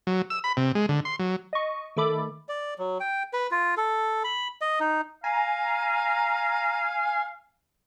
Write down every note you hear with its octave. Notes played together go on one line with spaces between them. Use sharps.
F#3
E6
B5
C3
G#3
D3
C6
F#3
D#5 C#6
D#3 A3 A4 B5 D6
D5
F#3
G5
B4
F4
A4
B5
D#5
D#4
F5 G#5 A#5